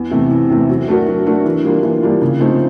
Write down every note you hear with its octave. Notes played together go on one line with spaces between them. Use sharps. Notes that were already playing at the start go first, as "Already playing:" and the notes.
Already playing: E2
C3 E3 A3
E2
C3 E3 A3
F#3
A3 D4 F#4 A#4
F#3
A3 D4 F#4 A#4
E3
G3 A#3 D4 F4
E3
G3 A#3 D4 F4
C#3
F3 A3 C4 D#4